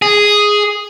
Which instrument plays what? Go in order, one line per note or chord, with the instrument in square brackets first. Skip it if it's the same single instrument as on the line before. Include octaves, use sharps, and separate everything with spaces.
[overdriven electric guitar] G#4